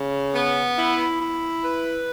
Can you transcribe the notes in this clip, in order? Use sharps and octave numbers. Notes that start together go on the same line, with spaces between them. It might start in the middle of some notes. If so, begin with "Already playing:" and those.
Already playing: C#3
B3
E4
E4
B4